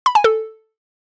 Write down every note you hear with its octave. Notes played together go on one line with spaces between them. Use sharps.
B5
G#5
A4